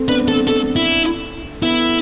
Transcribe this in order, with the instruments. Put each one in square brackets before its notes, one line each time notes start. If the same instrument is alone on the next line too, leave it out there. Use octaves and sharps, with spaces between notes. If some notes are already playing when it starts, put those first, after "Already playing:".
Already playing: [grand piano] A3 C4
[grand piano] B3 D4 [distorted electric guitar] B4
[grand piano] A3 C4 [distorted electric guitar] A4
[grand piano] A3 [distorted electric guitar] A4
[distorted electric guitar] E4
[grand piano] B3 [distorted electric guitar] E4